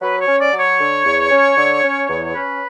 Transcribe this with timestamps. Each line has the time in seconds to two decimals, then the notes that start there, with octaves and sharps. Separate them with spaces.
0.01 F#3 B4
0.21 C#5
0.28 C#4
0.40 D5
0.53 F#3
0.60 C#5
0.80 D3
1.05 E2
1.32 C#4
1.57 D3
1.83 C#4
2.09 E2
2.35 C#4 B4